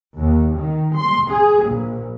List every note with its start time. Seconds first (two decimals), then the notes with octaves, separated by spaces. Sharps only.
0.17 D#2
0.56 D#3
0.97 C6
1.29 G#4
1.63 A#1